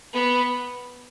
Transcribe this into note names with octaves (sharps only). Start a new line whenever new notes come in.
B3